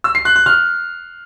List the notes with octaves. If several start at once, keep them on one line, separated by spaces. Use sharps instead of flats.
E6
C7
F#6
F#6
F6